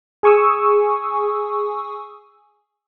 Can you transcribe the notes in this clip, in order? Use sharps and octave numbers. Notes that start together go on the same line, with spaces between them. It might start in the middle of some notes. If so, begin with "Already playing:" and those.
G#4 G#5 C#6 D#6 E6